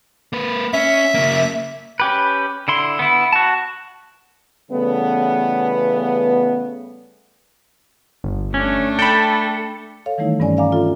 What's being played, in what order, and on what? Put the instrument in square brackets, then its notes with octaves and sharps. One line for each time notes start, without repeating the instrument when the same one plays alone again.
[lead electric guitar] A#3 B4
[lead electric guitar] C#4 [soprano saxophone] E5
[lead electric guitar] C#3 A#3
[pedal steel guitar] C#4 G4 B4
D3 E4 C6
B3 E4
F#4 A5
[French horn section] C#3 E3 G3 A3 B3
[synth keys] G1
[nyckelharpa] A3 D4 [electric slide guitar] C#4
[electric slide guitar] A4 [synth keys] G5 B5
[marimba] A4 C#5 F5
D#3 E3 G3 A3 D#4 E4
G2 G3 C4 C#4 D5 G#5
D5 E5 F5 G#5 A#5 D6
C4 F4 A4